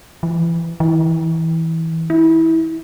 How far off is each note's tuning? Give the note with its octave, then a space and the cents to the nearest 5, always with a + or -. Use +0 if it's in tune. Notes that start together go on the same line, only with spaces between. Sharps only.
E3 +25
E3 -20
E4 -20